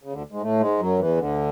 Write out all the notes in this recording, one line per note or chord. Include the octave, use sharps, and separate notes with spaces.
C#3
D2 D3
G#2 G#3
A2 A3
G#2 G#3
F#2 F#3
E2 E3
D2 D3